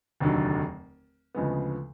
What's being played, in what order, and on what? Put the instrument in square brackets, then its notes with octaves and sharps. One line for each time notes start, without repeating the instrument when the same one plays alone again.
[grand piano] F1 D#2 D3 F#3
D2 C#3 F3 G#3 B3